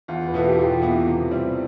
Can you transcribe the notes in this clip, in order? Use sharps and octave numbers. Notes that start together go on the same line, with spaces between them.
E2 F4
B4
B2 B3 E4 A4
G4
E2 F4
B2 B3 E4
C3
G3 C4 E4